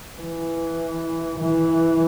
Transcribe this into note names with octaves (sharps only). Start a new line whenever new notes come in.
E3
E3